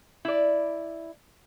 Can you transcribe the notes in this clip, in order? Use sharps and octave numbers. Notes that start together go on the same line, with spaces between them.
E4 D5